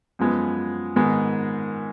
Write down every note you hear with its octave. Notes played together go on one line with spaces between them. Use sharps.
F#2 F3 G#3 B3
G#2 D#3 G#3 B3